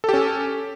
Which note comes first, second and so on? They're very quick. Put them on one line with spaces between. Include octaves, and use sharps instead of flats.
A4 G4 C#4